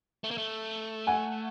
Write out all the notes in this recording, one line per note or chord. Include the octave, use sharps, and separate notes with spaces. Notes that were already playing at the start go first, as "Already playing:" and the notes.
A3
A#3
A3
F#5 G#5